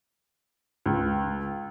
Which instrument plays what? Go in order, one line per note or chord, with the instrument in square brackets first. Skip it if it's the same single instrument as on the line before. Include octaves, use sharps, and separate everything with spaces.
[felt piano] C#2